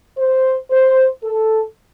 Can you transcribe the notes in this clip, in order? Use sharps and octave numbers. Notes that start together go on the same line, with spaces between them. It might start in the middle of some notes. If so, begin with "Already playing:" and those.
C5
C5
A4